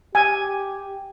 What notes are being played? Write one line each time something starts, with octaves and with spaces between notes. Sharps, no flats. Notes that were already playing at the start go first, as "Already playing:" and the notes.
G4 G#5